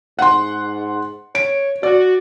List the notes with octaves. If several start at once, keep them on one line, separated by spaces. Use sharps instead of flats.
G#2 F#5 C6
C#5 D7
F#4 D5